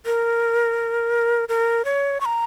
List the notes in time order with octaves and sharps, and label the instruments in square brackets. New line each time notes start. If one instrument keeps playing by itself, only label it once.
[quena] A#4
A#4
C#5
C#6
A#5